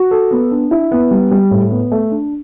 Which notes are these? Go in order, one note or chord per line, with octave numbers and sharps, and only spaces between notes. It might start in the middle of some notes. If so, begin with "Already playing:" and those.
Already playing: F#4
A4
B3
D4
E4
B3
G3
G3
A2
B3
A3
D4